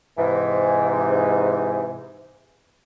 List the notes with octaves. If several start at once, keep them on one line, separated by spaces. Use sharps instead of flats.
G#2 C3 E3